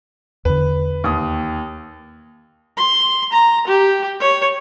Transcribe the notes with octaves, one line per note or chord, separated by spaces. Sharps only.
E2 D3 B4
D#2 D#6
C6
A#5
G4
C#5